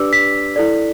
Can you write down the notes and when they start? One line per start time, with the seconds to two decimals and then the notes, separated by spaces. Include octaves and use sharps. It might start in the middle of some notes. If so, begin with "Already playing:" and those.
Already playing: D4 G4 B4 D5 D6 E6
0.13 B6
0.56 E4 A4 D5